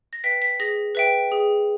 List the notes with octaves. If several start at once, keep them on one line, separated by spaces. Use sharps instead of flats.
A#6
B4 E5 G5 B6
B6
G#4 A#6
B4 E5 G5
G#4